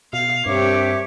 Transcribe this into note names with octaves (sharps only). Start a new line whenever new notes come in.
B2 F5
G2 C4 D4 G4 A#4 C#5 E5 D6